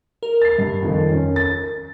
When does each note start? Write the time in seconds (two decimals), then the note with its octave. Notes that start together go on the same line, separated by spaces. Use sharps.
0.23 A#4
0.42 A6 C7
0.58 G2
0.82 F2 D#3 F3
1.11 C#4
1.36 A6